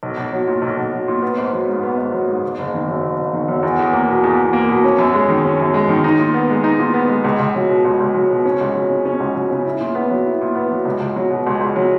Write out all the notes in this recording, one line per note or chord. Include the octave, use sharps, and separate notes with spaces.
B1
B1
F#3
A#2
B1
B1
F#3
A#2
B3
G#1
F#3
G#2
B3
G#1
F#3
G#2
F#1
F#1
D#3
F#2
F#1
F#1
D#3
F#2
E2
E2
A#3
B2
E2
E2
A#3
B2
C#4
F#2
G#3
D#3
C#4
F#2
G#3
D#3
D#4
A#2
B3
G#3
D#4
A#2
B3
G#3
C#2
C#2
F#3
B2
C#2
C#2
F#3
B2
C#4
C#2
F#3
C#3
C#4
C#2
F#3
C#3
E4
A#2
B3
F#3
E4
A#2
B3
F#3
C#2
C#2
F#3
B2
C#2
C#2
F#3